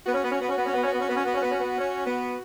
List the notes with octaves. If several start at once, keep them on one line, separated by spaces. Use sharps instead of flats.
B3 F#4
C#4
B3
C#4
B3
C#4
B3
C#4
B3
C#4
B3
C#4
B3
C#4
B3
C#4
B3
C#4
B3
C#4
B3